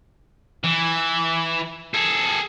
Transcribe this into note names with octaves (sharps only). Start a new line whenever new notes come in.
E3
G#4 A4